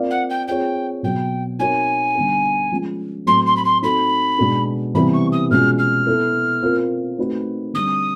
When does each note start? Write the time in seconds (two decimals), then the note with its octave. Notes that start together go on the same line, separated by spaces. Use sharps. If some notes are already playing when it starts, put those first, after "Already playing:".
Already playing: C4 F4 A#4 D5 F5
0.10 F#5
0.29 G5
0.48 C4 F4 G#4 C#5 G5
1.03 B2 F#3 B3 G5
1.59 C4 D#4 F#4 A#4 C#5 G#5
2.15 D3 G3 B3
2.72 F3 G#3 C#4
3.26 A2 F#3 A3 C4 C6
3.46 C6
3.56 B5
3.64 C6
3.82 C4 D#4 F#4 A4 B5
4.38 B2 G#3 B3 D4 F#4
4.94 C3 E3 G3 B3 E4 B5
5.13 C#6
5.32 D#6
5.51 B2 G#3 C#4 F4 F6
5.78 F6
6.07 B3 E4 A4
6.62 C4 F4 A#4
7.17 A3 C4 D#4 F#4 B4
7.73 D3 G3 C4 D#6